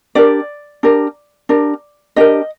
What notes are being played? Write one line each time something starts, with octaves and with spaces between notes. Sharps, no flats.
D4 G4 A#4 D5
D4 G4 A#4
D4 G4 A#4
D4 G4 A#4 D#5